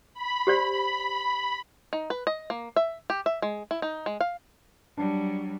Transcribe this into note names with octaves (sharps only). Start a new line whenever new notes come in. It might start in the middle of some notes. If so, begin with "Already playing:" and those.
B5
G4 C5 D5
D#4
B4
D#5
A#3
E5
G4
E5
G#3
E4
D#4
G#3
F5
F#3 G3 D4